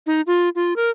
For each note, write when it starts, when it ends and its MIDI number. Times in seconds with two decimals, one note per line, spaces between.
0.06 0.21 63
0.27 0.49 65
0.55 0.74 65
0.76 0.90 70